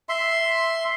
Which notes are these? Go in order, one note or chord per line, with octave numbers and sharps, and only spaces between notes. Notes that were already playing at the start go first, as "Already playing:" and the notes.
E5 C6